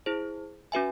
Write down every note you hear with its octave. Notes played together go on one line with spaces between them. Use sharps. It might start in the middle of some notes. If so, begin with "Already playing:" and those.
E4 G#4 C5
C#4 F#4 B4 E5 G#5